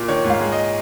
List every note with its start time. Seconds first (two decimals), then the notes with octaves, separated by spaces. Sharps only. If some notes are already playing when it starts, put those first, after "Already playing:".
Already playing: A#2
0.08 D#3 C#5
0.24 G#2
0.30 F5
0.41 G#3
0.52 D#5